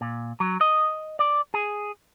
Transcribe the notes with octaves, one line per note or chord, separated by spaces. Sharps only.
A#2
F#3
D#5
D5
G#4